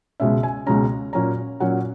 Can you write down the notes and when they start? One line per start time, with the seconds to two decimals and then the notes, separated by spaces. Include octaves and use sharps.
0.20 C#2 B2 G#3 C#4 E5
0.43 G#5
0.66 C#2 B2 G#3 C#4 A#5
1.13 A#2 F#3 C#4 A#5
1.60 A#2 F#3 C#4 F#5